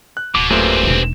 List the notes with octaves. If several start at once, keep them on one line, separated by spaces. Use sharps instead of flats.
F#6
D1 B2 D6
F#2 A#2 A3 C4 G4 G#4 B4 C5
E1 D#4